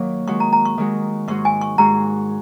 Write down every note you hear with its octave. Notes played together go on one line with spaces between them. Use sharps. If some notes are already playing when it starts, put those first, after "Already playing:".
Already playing: D#3 F#3 A#3
D#3 G#3 F#4 C#6
A#5
A#5
C#6
D#3 G#3 F#4
G#2 G#3 F#4 C#6
G#5
C#6
G#2 G#3 F#4 A#5